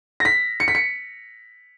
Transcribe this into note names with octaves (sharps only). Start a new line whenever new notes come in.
A#6
B6
C#7
B6
C#7